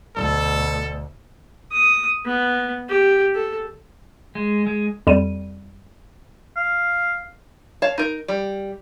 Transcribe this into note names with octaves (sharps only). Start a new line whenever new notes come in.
D2 B2 A4
D#6
B3
G4
A4
G#3
G#3
F2 G3 D#7
F5
C#5 F5 A5
D#4 A#4
G3